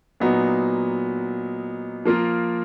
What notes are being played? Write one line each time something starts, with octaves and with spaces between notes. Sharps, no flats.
A#2 F#3 B3 D#4
F3 A#3 F4 A#4